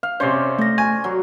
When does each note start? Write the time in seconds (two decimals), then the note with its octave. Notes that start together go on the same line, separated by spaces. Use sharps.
0.03 F5
0.20 C3 C#4 C5 D5
0.59 A3 A#6
0.78 G#5 C#6
1.04 F#3